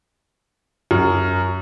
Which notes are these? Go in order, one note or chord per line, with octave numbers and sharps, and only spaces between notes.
F#2